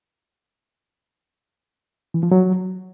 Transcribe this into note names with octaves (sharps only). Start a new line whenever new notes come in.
E3
F3
F#3